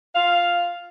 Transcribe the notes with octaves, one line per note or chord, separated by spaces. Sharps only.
F4 F5